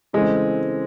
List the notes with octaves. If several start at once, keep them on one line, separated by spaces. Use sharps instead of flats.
C#3 E3 G#3 A3 C4